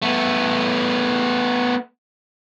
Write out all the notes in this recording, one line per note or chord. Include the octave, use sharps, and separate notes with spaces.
A3 B3